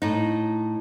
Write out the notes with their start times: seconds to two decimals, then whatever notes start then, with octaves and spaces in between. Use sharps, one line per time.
0.02 A2 D#4